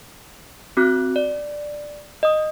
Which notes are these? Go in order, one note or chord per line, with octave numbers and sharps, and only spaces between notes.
C4 F#4 D6 F#6
D5
D#5 D#6